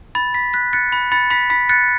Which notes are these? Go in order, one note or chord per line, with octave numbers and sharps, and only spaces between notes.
B5 A6
B5 B6
F#6 B6
F#6 A6 C#7
B5
B5 A6 C#7
B5 B6
B5 B6
F#6 A6 C#7